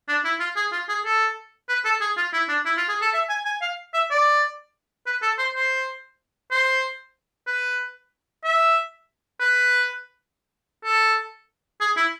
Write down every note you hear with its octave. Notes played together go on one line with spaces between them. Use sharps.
D4
E4
F4
G#4
F4
G#4
A4
B4
A4
G#4
F4
E4
D4
E4
F4
G#4
A4
E5
G#5
G#5
F5
E5
D5
B4
A4
C5
C5
C5
B4
E5
B4
A4
G#4
E4